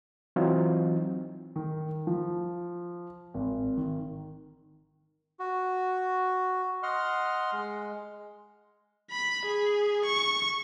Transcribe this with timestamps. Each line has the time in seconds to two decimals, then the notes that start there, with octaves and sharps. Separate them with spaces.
0.36 E3 F#3 C4 D#4 F4
1.56 D#3
2.07 F3
3.34 G#1
3.77 D#3
5.40 F#4
6.83 D#5 F#5 C6 F6
7.52 G#3
9.11 B5
9.45 G#4
10.05 C#6